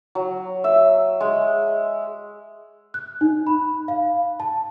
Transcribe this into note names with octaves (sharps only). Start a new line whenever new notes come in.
F#3
E5
G#3
F#6
D#4
B5
F5
A5